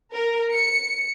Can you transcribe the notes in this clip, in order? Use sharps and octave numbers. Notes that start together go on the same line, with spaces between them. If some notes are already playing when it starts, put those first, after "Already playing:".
A#4
C#7